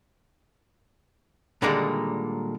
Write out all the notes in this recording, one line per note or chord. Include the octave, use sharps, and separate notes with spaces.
A#2 D3 D#3 G3 G#3 A#3